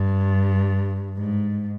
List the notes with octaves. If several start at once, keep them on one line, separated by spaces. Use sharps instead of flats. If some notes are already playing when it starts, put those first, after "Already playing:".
Already playing: G2
G#2